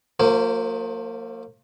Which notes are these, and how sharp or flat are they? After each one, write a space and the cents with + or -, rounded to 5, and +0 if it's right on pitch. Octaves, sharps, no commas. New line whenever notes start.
F3 +40 A#3 -30 C5 +0